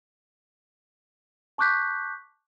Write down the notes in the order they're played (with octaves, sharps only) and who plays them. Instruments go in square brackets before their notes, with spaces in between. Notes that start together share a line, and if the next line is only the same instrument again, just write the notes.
[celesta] A5 C#6 D6 F#6 G6 B6